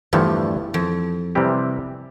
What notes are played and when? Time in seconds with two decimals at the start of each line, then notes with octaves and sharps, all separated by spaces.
0.13 E2 G2 D3 F3 A3
0.74 F2
1.35 C3 E3 G3 C4 G4